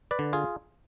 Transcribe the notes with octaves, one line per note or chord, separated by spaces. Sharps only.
B4 D5
D3
F4 G#4